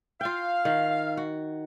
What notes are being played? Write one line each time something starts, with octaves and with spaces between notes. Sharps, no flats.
F4 F5 G5
D#3
F#4